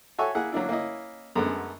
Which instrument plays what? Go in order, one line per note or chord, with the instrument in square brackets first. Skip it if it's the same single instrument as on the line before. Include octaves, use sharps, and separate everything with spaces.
[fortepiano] F#4 A4 C#5 E5 G#5 C#6
A#3 E4 G#4 F#5
F#3 A#3 D4 E4
A#3 C#4 E4 D#5
F#2 D3 G#3 A3 B3